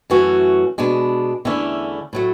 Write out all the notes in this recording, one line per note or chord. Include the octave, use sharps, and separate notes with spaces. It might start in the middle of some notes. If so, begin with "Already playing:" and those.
F#2 E3 A3 C#4 F#4
B2 G#3 D4
E2 D3 A3 C#4 E4
A2 F#3 A3